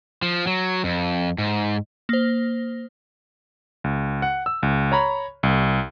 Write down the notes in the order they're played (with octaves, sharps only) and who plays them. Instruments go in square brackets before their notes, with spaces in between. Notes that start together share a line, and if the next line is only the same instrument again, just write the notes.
[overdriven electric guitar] F3
F#3
F2
G#2
[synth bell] A#3 C5
[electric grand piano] C#2
F#5
E6
C#2
C#5 A#5 B5
C2